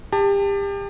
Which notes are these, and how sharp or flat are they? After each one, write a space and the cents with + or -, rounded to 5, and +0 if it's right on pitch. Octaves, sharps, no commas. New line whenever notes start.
G4 +30 A5 +15